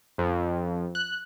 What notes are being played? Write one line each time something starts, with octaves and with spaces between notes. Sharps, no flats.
F2
F#6